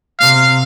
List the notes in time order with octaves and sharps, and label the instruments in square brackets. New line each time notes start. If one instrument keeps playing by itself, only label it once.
[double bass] C3 [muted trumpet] F5